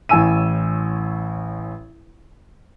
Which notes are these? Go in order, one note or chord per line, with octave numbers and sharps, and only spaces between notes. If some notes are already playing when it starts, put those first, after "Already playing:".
A1 A2 G#5 E6 D#7